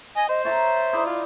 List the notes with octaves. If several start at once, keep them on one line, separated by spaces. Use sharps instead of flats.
D#5 G#5
C5 D#5
C#5 E5 A5 A#5
D#4 E4 D5
F4